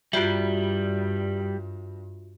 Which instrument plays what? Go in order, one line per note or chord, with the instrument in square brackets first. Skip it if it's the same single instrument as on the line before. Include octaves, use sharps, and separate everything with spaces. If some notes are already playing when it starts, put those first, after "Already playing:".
[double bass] G2 [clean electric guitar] G3 [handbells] F4 F#4 E5